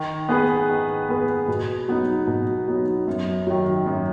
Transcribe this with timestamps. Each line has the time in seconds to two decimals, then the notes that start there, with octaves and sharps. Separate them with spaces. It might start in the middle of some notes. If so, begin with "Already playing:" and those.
Already playing: D#3
0.29 B3 G#4 B4
0.69 D#3
1.09 B3 G#4 B4
1.48 B2
1.88 F#3 B3 D#4
2.27 B2
2.67 F#3 B3 D#4
3.08 F#2
3.47 D#3 F#3
3.86 F#2